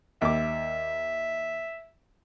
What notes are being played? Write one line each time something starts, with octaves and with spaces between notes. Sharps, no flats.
D#2 E5 D6